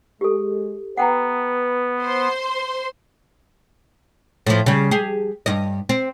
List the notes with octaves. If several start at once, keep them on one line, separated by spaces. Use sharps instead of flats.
G#3 G4 A4
B3 B4 F#5 G5 A#5
C5 C6
A2 F3
C#3 G3
G4 G#4
G2 D#5
C4